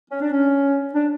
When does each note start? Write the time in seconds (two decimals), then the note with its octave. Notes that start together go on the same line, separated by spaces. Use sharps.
0.10 C#4
0.21 D4
0.32 C#4
0.94 D4